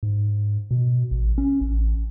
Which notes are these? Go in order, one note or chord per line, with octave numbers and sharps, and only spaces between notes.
G#2
B2
A1
C#4
A1